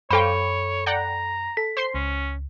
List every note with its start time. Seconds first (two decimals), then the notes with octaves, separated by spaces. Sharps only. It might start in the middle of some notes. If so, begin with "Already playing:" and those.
0.11 F#2 A4 C5 C#5 F5 G5 B5
0.86 D5 F#5 G5 A#5
1.57 A4 B6
1.77 C5 C6 C7
1.94 C#2 C#4